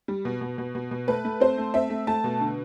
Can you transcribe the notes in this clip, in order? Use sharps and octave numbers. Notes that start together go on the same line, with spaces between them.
G3
B2
B2
B2
B2
B2
A3 B4
A3
C4 C5
A3
C4 E5
A3
A3 A5
B2
D3